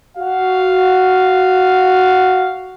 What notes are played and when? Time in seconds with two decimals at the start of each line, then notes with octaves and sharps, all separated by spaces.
0.18 F#4 F5